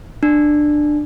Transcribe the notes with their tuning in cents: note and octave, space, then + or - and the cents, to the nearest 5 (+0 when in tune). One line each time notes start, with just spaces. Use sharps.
D4 +15